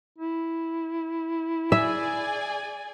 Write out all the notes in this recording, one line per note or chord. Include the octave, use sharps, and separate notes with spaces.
E4
G#4 D5 E5 G#5